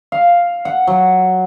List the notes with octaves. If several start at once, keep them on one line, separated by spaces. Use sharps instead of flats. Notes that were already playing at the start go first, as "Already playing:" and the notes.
F5
F#5
F#3